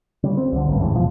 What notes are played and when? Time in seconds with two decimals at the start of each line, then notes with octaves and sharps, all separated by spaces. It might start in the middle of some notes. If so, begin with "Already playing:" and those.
0.23 C#3 G3
0.37 C4
0.52 C#2 D3
0.68 A1 G2
0.79 E2 A2 E3 G#3
0.94 B2 F3